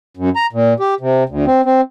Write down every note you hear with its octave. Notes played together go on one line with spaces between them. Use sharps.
F#2
A#5
A#2
G4
C3
D2
C4
C4